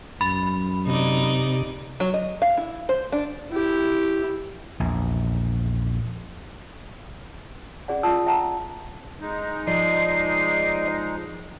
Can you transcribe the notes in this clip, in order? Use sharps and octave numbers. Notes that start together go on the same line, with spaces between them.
F#2 B5
C3 D#4 D5
F#3
D#5
F5
E4
C5
D4
E4 G4
A#1 E2
C#4 G#4 D5 F#5
C#4 F4 D5 A5 D#6 E6
E5 F#5 G5 A5 A#5
G#3 D#4
F3 D5 D#5 C7